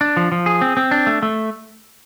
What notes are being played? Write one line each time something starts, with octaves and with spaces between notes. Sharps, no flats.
D4
F3
F3
G#4
C4
C4
D4
A3
A3